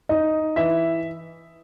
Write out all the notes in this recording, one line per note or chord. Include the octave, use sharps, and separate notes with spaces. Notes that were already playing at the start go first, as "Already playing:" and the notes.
D#4 D#5
E3 E5